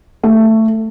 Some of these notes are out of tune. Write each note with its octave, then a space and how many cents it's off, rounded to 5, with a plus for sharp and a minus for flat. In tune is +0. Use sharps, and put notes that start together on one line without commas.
A3 +15